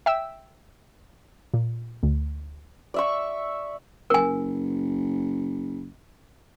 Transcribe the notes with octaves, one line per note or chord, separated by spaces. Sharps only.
E5 G5 E6
A#2
D2
D5 E5 C#6
F#1 A#4 G#5